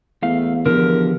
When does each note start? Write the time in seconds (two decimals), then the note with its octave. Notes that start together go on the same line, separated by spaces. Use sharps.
0.23 E2 A3 F5
0.66 E2 D3 F3 G4 A#4